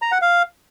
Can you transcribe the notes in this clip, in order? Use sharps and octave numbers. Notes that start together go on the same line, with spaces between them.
A#5
F#5
F5